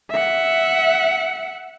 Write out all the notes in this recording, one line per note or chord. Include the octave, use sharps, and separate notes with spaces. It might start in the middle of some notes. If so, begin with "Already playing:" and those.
E5 F#5